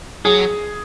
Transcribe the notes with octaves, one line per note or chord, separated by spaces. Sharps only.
F#3 G#4